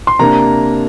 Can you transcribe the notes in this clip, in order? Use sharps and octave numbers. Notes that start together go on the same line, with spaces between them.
C6
C3 A#3 D4 A#5